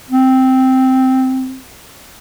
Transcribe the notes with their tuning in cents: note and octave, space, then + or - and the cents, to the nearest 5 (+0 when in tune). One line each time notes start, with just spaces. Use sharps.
C4 -5